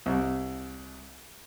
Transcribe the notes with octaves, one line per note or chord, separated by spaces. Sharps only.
C2